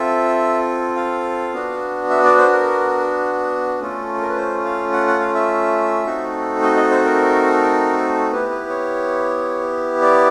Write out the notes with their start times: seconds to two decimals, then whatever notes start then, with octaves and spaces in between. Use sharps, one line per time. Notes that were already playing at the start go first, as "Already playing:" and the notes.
Already playing: C4 F4 A4 E5
0.96 F5
1.53 B3 D4 F#4
2.10 E5
2.24 D5
2.38 C5
2.53 A#4
3.80 A3 C#4 F4 A4
4.14 A4
4.21 A#4
4.29 B4
4.36 C5
4.65 F5
4.93 F#5
5.07 F#5
5.21 F5
5.35 E5
6.06 A3 C4 D#4 F#4 A4
6.62 D#5
6.76 D#5
6.91 C5
7.04 A#4
8.32 B3 E4 G4 B4
8.51 B4
8.69 C#5
10.02 D5